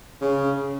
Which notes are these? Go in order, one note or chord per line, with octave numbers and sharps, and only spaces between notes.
C#3